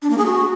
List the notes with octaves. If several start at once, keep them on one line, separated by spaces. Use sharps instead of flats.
D4
A#3
G#4
F#4